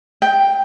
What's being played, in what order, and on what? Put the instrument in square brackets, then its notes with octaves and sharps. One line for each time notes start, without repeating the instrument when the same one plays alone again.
[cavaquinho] G5